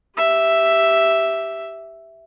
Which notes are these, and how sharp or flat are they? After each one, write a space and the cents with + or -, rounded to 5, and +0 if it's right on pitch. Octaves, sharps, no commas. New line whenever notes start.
G4 +0 E5 +0